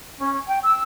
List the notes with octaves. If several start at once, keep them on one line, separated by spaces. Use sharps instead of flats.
C#4
G5
E6